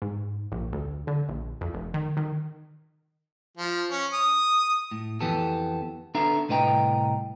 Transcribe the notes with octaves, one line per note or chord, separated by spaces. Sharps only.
G#2
A#1
D2
D3
A#1
F2
F1
D#3
D#3
F3
C#4
D#6
A2
F2 E3 B3 G4 A4
B3 D4 A4 E5 A#5
C2 A2 B4 D#5 G5 A#5